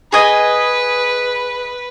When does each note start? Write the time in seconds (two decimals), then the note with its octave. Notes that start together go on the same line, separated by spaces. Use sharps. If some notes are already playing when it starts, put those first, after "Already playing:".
0.12 G#4 B4 D#5 G#5